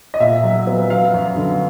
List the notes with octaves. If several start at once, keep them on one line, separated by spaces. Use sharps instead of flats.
D#5
A#2 E5
F#3
B3
F#3 F5
F#2
D3